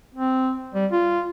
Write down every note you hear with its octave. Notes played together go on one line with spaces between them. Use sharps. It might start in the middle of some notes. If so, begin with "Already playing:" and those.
C4
G3
F4